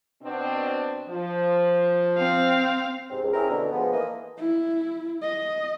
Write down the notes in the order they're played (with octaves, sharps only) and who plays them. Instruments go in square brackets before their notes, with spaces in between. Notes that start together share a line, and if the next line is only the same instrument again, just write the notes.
[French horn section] B2 C4 D4
F3
[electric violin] C4 F5
[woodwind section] G#2 C3 C4
C#2
C4 C#4 E4 G#4 A#4
B2 D3
F3 G#3 B3
E3 A3 A#3 D#5
[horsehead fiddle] E4
D#5